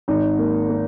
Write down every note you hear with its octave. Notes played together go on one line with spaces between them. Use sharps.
G#1 D#4
A#3
A#3